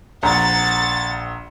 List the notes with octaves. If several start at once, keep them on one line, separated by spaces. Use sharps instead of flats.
A#1 F#5 A#5 A6